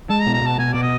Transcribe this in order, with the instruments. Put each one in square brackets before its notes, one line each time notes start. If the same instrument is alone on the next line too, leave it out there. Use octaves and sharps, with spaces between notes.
[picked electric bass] G#3 [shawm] A5
[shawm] A#5
[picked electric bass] B2
[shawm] A#5
[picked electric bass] B2 [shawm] A5
[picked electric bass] B2 [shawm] G#5
[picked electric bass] B2 [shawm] D5
[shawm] D#5